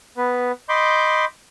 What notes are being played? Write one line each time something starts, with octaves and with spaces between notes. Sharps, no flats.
B3 B4
D#5 B5 C6 D6 G6